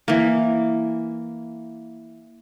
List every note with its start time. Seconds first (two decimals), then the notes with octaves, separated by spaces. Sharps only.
0.08 E3 A#3